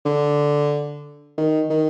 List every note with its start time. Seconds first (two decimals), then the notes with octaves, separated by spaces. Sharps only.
0.05 D3
1.38 D#3
1.70 D#3